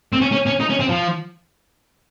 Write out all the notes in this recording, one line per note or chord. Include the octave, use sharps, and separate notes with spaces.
C4
C#4
C#4
C#4
D#4
C#4
C4
F3